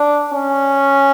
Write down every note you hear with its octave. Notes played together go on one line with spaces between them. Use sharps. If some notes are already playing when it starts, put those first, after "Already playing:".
Already playing: D4
C#4